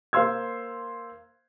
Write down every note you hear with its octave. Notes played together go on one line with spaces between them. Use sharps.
A#3 C5 F5 C6 E6 G#6